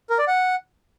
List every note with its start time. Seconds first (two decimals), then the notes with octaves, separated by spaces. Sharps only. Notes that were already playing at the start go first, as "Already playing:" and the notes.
0.10 A#4
0.19 D5
0.28 F#5